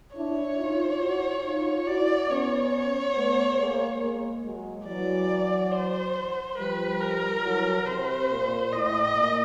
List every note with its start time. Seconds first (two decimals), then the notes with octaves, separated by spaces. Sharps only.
0.15 D4 E4 C#5
0.58 D#4 F4
1.01 E4 F#4
1.44 D#4 F4
1.86 E4 F#4 D5
2.29 B3 C#4 C#5
3.15 A3 B3
3.58 G#3 A#3
4.01 G#3 A#3
4.43 F#3 G#3
4.86 E3 F#3 D5
5.71 C5
6.57 F3 G3 B4
7.01 A#4
7.43 E3 F#3
7.86 C3 C5
8.29 A#2
8.72 A2 D#5
9.15 A#2